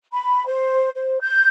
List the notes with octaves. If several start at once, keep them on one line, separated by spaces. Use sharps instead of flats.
B5
C5
C5
G6